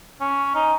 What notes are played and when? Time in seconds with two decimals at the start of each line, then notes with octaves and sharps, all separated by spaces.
0.21 C#4
0.55 D#4